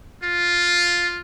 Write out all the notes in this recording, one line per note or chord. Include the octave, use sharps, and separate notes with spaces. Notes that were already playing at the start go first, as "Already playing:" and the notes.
F4